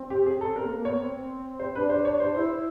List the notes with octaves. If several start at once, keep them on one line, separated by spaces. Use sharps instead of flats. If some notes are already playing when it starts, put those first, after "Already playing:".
Already playing: C4
G4
G#4
A4
C4 A#4
A#3
A#3
B3 C#5
C4
C5
D4 B4
C5
C#5
C5
E4 C5